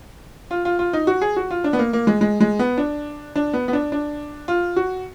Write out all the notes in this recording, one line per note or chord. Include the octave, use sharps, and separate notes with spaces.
F4
F4
F4
D#4
F#4
G#4
F#4
F4
D4
B3
A#3
A#3
G#3
G#3
G#3
B3
D4
D4
B3
B3
D4
D4
F4
F#4